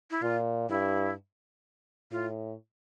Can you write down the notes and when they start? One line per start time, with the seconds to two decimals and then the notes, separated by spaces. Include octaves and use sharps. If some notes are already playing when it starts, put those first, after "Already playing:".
0.11 E4
0.22 A#2 F4
0.69 G2 E4
2.11 A2 F4